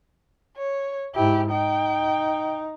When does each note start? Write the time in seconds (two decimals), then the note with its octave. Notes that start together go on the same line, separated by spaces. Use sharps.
0.57 C#5
1.15 G#2 E4 G4
1.51 D#4 G5